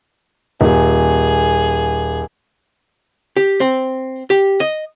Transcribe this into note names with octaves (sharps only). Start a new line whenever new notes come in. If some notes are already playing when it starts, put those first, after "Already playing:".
D#1 G#4
G4
C4
G4
D#5